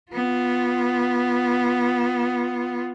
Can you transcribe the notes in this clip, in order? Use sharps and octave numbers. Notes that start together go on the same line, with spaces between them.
B3 F4